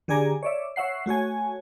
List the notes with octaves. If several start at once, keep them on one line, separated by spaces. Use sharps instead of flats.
D3 G4 G#4 D5 G#5 A#5
C#5 D5 E5
C#5 E5 F#5 C7
A3 F#4 C#5 G#5